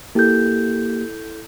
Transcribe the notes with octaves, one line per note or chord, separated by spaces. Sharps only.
A#3 E4 G4 A4 G6